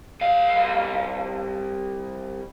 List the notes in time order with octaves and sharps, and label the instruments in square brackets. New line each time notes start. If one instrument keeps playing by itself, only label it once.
[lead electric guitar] C2 F5